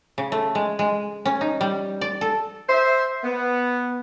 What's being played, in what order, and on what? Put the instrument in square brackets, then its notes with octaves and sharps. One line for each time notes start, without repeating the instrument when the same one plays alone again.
[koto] C#3
A3
G#3
G#3
C#4
D#4
G3
D5
A4
[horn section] C5 E5
B3